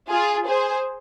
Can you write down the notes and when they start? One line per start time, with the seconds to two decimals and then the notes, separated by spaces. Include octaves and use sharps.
0.10 F4 G#4
0.47 G#4 C5